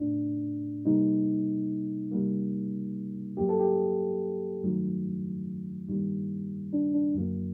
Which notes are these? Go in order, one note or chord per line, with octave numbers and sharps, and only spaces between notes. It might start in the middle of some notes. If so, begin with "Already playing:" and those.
Already playing: A2 A3 D4
C3 G3 A#3 D#4
C3 G3 A#3
G2 F#3 A#3 G4
A4
G4
G2 D#3 F#3 A3
G2 D#3 G3 A#3
D4
D4
F#2 D3 F#3 A#3